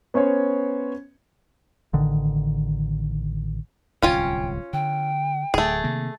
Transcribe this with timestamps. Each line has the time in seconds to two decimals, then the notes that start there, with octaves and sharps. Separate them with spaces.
0.14 B3 C#4 C5 C#5
1.93 A1 D3 D#3
4.02 D1 C2 C#4 F4 G5 G#5
4.73 D3 G5
5.54 D1 A3 G#4
5.84 C3 D#3 A#3